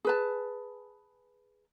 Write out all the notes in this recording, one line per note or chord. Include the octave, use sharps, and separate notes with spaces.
G#4 B4 A5